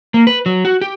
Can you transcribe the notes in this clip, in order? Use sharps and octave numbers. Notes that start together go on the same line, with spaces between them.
A#3
B4
F#3
F#4
G4